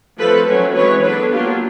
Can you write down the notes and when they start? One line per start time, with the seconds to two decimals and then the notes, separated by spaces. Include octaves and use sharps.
0.18 F3 A3 C4 A4 B4
0.46 F#3 A3 C#4
0.75 E3 G#3 C4 B4 C#5
1.03 F#3 B3 D4 A4 B4
1.32 F#3 A#3 D4 F4 G4